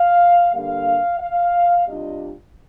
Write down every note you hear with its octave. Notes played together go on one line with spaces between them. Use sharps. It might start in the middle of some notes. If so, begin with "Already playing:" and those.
Already playing: F5
G2 D3 G3 A#3 F5
F5
C3 G3 D4 F4 D#5